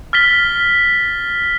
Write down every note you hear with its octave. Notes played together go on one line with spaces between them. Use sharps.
F6 A6 B6 G7